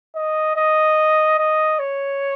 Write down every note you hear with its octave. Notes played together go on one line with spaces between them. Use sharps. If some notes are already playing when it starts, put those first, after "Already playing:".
D#5
D#5
D#5
C#5